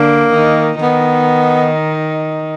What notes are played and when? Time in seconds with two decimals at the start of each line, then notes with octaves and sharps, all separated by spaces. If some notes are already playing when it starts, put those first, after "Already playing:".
Already playing: D3 A#3 D4
0.33 D#3 D#4
0.82 D#3 B3 D#4